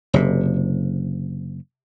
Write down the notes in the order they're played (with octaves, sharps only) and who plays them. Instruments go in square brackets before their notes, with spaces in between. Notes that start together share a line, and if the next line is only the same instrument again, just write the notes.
[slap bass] F#1 C3